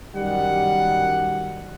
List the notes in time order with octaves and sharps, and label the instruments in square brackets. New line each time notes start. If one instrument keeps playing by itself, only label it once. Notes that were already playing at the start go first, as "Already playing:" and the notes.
[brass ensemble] F#2 D#3 F#5 [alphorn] G3